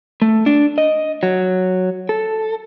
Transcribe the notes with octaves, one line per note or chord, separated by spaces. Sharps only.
A3
D4
D#5
F#3
A4